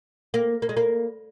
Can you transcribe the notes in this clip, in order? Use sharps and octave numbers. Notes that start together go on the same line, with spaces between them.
A#3
A#3
G#3
A#3